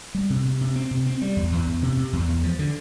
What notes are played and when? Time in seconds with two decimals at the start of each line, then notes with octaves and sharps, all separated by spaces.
0.15 G3
0.30 C3
0.45 C3
0.61 C3
0.76 C4
0.91 C3
1.06 C4
1.22 G3
1.36 E2
1.52 E2
1.67 E2
1.83 C3
1.97 C3
2.13 E2
2.29 E2
2.43 F3
2.59 D3